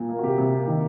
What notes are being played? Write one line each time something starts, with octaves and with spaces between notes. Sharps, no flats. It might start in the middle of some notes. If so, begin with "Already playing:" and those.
Already playing: A#2
A#3
F#4
C3 G4
C3
A#3
D#3